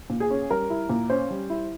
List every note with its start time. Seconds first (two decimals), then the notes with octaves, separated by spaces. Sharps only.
0.10 A#2
0.20 G#4
0.30 C#4
0.51 G3 A#4
0.70 E4
0.89 A#2
1.10 C#4 C5
1.30 G3
1.50 E4